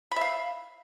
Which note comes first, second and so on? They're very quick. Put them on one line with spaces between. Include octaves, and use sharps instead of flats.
B5 E5 F5